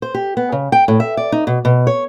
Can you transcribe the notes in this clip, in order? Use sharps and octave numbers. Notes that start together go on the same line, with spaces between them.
C5
G4
B3
C#3
G5
A2
E5
D5
D#4
B2
B2
C#5